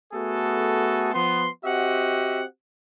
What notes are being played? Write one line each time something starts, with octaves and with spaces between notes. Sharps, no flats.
A3 B3 F#4 G#4 A4
F3 B3 C6
C4 F#4 G4 D#5 E5 F#5